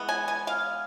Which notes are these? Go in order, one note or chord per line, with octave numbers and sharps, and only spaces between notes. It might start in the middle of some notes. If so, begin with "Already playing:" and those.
Already playing: E3 G#3 B3
G#5
G#5
F5